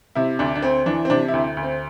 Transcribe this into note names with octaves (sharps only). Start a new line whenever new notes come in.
C3 E4
D2 D4
D4
D2 C4
E3 D4
C4
C3 D4
E4
D2
D2
C4